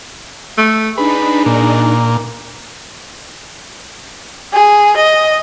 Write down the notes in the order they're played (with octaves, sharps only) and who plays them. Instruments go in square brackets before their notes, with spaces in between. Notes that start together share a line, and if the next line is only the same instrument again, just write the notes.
[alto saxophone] A3
[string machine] D4 D#4 [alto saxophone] G#4 [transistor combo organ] B4
[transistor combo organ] A#2
[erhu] G#4
D#5